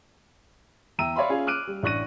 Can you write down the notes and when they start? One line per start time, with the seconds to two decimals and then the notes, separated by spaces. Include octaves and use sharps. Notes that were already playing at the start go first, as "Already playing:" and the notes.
0.99 E2 E5 G5 A#5 E6 D#7
1.16 C#5 D5 E5 F5 B5 C6
1.29 C#4 F4 G#4 F5
1.47 D6 F6 F#6 D7 D#7
1.67 G3
1.83 A1 D4 C#6 F#6 A#6 D#7